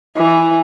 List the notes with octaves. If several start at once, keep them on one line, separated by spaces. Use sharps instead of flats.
E3